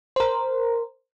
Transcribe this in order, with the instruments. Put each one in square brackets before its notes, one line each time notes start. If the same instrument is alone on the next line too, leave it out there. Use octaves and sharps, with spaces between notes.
[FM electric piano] A#4 C5